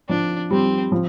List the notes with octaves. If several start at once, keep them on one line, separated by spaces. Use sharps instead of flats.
F3 D4
G3 C4
F3